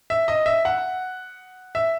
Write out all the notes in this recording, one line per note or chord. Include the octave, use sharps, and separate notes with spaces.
E5
D#5
E5
F#5
E5